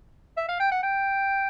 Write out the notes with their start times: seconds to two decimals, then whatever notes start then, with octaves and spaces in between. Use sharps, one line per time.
0.37 E5
0.48 F5
0.60 G5
0.71 F#5
0.83 G5